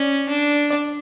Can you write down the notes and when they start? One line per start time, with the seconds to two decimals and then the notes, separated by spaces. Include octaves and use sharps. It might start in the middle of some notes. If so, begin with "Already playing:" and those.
Already playing: C#4 D5
0.29 D4
0.70 D5